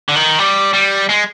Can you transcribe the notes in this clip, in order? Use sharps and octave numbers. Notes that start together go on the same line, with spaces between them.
D3
D#3
G3
G3
G#3